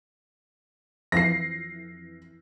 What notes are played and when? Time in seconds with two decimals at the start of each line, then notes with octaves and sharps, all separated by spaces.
1.12 F2 E3 A#6 C7